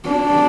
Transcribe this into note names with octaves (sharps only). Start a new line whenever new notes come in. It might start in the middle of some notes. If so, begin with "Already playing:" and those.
D4